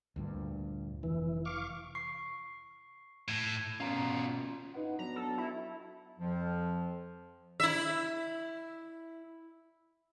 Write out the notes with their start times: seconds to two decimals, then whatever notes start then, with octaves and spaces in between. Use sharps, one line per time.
0.16 D2 G2 A#2
1.03 F1 E3
1.45 F5 C#6 D6
1.95 C#6 C7
3.28 A2 G#6
3.80 B2 C#4 F4 A#5
4.74 D#4 B4 F#5
4.99 F#3 B3 D4 A#5
5.16 A4
5.38 E4
6.19 F2 F3
7.60 E4 E5